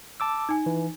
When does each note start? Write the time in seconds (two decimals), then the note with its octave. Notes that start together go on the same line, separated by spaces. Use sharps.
0.20 A5 D6 E6
0.49 D#4 G#5
0.66 E3